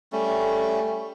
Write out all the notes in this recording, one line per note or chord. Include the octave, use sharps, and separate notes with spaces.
G3 A3 C#4